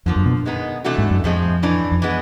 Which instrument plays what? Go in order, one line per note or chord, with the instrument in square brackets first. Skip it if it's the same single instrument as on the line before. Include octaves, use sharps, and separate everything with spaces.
[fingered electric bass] F2 [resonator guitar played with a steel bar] D3 F3 A#3
[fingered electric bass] F#2
B2
[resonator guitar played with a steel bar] D#3 G#3 B3 D#4
C3 E3 A3 D4 F#4
[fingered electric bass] G#2
F#2
[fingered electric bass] F2 [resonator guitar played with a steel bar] A2 F3 G#3 C4
[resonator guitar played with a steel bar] A2 E3 A3 D4
[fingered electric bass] F2
[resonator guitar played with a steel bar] E3 G#3 B3